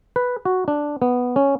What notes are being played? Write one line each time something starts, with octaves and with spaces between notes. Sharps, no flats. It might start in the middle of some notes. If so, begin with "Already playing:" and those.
B4
F#4
D4
B3
C#4